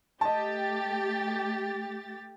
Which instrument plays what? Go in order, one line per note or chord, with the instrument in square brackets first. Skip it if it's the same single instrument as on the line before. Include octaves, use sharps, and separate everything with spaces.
[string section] A3 G4 A6 [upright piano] D#5 A5